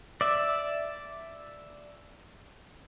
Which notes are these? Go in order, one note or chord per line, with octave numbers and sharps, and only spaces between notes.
D5 E5